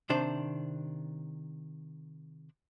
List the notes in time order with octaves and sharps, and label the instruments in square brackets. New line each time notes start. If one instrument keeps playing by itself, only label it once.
[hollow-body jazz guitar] C3 D#3 D4 C5